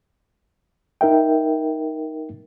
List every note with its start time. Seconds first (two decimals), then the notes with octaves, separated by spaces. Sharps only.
1.01 D#4 A#4 E5 G5